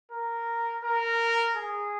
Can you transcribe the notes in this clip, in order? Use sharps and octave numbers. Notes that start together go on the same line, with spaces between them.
A#4
A#4
G#4